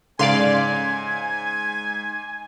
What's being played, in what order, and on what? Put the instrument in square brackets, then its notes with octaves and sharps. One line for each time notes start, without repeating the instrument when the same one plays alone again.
[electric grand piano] G#2 [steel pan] C#3 [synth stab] D5 F5 C6 [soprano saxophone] G#5